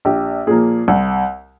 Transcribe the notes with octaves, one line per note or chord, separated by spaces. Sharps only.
A#1 G4
A#2 F3 A#3 G#4
C2